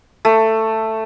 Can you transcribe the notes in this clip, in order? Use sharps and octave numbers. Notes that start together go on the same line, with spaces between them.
A3